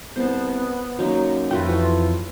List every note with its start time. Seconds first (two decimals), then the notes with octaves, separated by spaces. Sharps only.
0.16 C2 B3 C5 A5
0.99 F#2 F#3 A#3 D#4
1.51 F2 G#2 A3 F4 F#4 B4 G5
1.69 E3